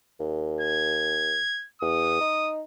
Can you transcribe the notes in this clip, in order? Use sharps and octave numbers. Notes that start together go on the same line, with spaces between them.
D#2
G#6
E2 D#6
D#4